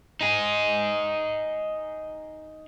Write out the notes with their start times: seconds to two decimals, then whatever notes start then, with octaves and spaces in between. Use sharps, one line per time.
0.21 D#4 G#4